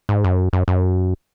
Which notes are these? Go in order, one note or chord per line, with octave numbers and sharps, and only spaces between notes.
G#2
F#2
F#2
F#2